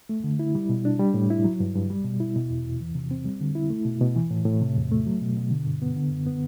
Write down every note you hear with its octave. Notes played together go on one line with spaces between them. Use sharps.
A3
D3
E4
G3
B2
D4
G3
A2
E4
F#3
G2
G2
G3
B2
E4
B2
E2
E2
E3
C3
C4
G3
D3
E4
A3
B2
B2
E3
A2
A2
C3
E2
A3
F#3
B2
B2
D3
G2
B3
D3
F#2
B3